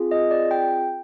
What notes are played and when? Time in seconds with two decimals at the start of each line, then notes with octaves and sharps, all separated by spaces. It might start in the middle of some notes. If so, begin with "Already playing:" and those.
Already playing: C4 F4 G#4
0.11 D#5
0.31 D5
0.51 G5